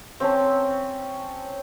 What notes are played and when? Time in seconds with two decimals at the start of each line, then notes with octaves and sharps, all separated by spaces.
0.20 C4 C#4 A5